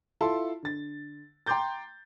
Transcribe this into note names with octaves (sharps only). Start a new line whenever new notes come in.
E4 F4 A4 A5 C6
D3 A6
G5 A#5 C6 D6 G6 A6